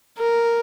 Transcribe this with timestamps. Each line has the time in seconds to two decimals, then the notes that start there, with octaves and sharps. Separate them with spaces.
0.18 A#4